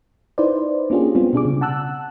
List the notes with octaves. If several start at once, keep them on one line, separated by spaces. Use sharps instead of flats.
D#4 E4 B4 C5 D5
A#3 C#4 D4 F4 G4 G#4
G3 G#3 B3 C4 F4
B2 D4 G#4 D6
C#3
F#5 A5 E6 F#6